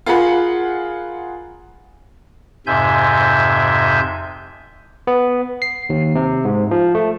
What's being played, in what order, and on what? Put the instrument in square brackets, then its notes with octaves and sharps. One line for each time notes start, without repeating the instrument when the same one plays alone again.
[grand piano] F4 G#4 A#4 F#5 B5
[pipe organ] F2 G#2 C3 E5 G#5 G6
[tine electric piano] B3
C7
D#2
C3
G#2
F3
A3